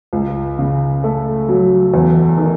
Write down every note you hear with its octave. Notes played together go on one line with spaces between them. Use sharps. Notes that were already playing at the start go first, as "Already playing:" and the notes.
C#2
C#3
A3
F#3
E2
D#3